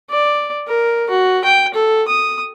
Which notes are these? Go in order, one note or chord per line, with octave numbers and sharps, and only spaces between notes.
D5
A#4
F#4
G5
A4
D#6